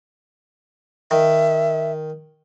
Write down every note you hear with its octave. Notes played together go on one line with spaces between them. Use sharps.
D#3 E5